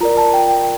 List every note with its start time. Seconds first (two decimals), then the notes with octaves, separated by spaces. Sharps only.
0.01 F4 A#4 D5 A#5
0.17 A5
0.33 G5
0.50 G5